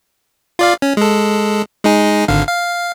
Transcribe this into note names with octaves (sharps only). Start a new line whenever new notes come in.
F4 D5 F5
C#4
G#3 A4
G#3 D#4 G#4
G#1 D3 F5
F5